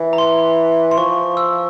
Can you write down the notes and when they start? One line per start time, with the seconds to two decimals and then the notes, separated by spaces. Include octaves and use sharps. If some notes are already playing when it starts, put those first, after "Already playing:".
Already playing: E3
0.13 A#5
0.18 C6
0.91 C6
0.98 F3 C#6
1.37 E6